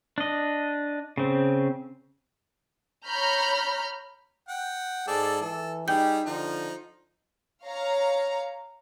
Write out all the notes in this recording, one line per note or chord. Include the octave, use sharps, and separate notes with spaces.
D4 D#5
C#3 C4
C#5 A#5 B5 F6 G6
F#5 G5
G#2 G#4 A4 D5
E3 A4
G3 D#4 G4 G#4 G5 G6
D3 F3 D#4
C#5 F5 A#5